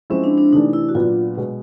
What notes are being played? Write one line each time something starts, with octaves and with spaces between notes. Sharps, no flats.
F3 G#3 C4 C#4 E4
D4
D4
C3 E3 A3 D4 D#4
E4
F#4
A#2 F#3 B3 D4 F4
B2 G#3 B3